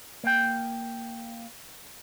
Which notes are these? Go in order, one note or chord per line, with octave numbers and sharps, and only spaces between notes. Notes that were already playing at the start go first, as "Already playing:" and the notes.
A#3 G5